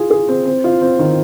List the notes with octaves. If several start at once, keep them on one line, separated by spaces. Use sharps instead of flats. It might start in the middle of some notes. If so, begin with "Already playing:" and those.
Already playing: F4 G#4
G#4
C4
C4
F4
C4
D#3